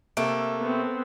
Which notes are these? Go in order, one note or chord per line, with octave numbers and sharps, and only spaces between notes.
C3 A3 A#3 D7
B3 C4